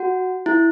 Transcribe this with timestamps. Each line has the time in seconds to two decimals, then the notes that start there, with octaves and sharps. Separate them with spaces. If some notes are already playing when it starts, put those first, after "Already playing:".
Already playing: F#4
0.46 E4